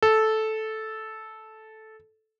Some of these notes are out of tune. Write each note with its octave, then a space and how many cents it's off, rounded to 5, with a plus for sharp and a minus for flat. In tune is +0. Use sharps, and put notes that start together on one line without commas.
A4 -10